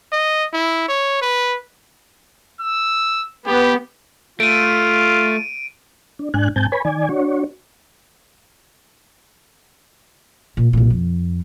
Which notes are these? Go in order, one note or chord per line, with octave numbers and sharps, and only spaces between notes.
D#5
E4
C#5
B4
E6
B3 G4
A3 F4 D7 D#7
D4
G#2 D4 G#5 F#6
G#2 C4 G#5 A5 G6
B4 C#5 G#5 B5
D#3 D5 G#5
D4 F#4 C#5
A#2
C2 A#2
F2